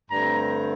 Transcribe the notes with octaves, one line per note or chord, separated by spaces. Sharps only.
G2 D3 A3 C4 A#5